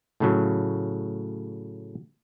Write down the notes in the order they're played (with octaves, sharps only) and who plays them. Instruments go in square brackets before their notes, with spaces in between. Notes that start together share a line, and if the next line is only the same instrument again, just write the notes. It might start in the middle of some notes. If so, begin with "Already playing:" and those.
[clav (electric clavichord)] A2 C#3 F#3